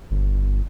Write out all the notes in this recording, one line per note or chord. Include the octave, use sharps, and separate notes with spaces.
G1